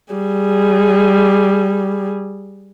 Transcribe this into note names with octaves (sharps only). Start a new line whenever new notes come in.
G3 G#4